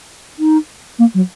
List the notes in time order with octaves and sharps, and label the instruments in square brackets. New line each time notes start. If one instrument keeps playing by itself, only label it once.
[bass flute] D#4
A#3
F#3